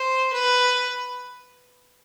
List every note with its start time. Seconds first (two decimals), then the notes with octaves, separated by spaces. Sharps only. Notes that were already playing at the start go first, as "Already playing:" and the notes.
Already playing: C5
0.33 B4